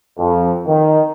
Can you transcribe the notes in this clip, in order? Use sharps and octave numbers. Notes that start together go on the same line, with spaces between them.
F2
D#3